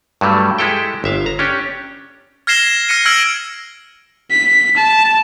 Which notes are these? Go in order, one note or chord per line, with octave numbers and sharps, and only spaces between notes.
G2 F#3 G3 A3
G#3 E4 G4 A4 G5
G1 E5 F5
A#5
C#4 D4 G4
F6 G#6 A#6 C7 E7 G7
F6 A#6 C#7 D#7
E6 F6 G#6 A#6 D7 F#7
B6
A5